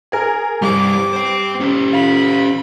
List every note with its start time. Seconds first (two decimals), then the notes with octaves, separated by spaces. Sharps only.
0.12 G#4 A#4
0.62 G2 G3 C5 D6
1.13 C5 G5
1.60 C#4 G4
1.93 F4 B5